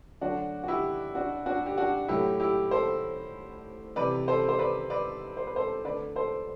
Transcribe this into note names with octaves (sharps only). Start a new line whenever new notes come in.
D3 F#3 A3 D4 F#4
F#4
E4 G4
D4 F#4
D4 F#4
G4
D4 F#4
A2 F#3 A3 E4 G4
E4 G4
A4 C5
C3 E3 G3 B4 D5
A4 C5
C5
B4 D5
B4 D5
C5
B4
A4 C5
D3 A3 B4 D5
A4 C5